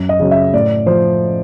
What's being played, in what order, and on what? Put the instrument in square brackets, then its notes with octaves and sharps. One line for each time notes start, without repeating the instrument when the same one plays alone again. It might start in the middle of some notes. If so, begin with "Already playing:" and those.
Already playing: [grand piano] F#2
D#5
C#3 F#3
E5
A2 D5
F3 C5